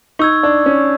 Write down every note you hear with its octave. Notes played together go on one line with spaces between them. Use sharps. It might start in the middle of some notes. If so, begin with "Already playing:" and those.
D#4 C#6 E6 G#6
D4
C#4